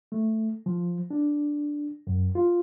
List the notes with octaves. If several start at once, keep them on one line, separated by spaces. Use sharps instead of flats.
A3
F3
D4
F#2
F4